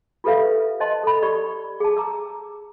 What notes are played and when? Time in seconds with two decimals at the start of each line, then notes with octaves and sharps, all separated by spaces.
0.24 F4 G4 A4 B4 E5 F5
0.80 C5 D#5 A5 C6
1.04 A4 B5
1.22 G4 D5 C#6
1.80 G#4 A5
1.97 A#5 D6 E6